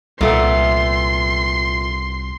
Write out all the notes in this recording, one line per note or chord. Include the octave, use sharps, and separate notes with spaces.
C2 A#2 A3 B3 C6